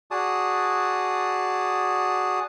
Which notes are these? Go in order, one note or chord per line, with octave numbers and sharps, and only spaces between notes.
F#4 G#4 D5 A5 D#6